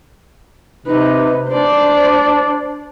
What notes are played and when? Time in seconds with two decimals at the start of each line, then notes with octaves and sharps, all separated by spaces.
0.86 C3 D#4 B4
1.49 D4 C5 D5